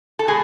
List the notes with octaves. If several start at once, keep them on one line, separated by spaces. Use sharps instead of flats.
A4
B2 G#3 G#4